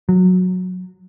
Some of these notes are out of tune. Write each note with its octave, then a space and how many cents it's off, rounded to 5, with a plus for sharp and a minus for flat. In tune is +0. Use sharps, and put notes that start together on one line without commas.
F#3 -15